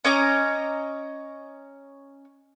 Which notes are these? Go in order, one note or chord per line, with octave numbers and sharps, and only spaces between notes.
C#4 D#5 A#5 D6